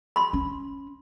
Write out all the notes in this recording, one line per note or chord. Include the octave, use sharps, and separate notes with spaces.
B5 C6
C#4